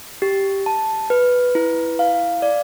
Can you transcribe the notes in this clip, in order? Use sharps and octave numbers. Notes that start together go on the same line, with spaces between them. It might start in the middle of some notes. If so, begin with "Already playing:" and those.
G4
A5
B4
E4
F5
D5